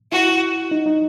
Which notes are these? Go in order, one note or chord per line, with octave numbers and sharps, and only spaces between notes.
E4 F#4
D#4
D#4